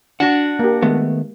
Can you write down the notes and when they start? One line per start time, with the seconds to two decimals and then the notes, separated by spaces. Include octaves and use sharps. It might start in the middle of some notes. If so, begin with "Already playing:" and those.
0.20 D4 F#4 F#5
0.59 A#3 G4
0.82 D#3 G#3 A3 B3